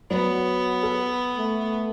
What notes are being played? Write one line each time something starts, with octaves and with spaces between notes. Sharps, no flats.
F#3 B3
A4
A3